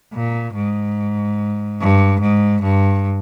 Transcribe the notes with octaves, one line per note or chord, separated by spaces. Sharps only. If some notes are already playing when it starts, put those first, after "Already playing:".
A#2
G#2
G2
G#2
G2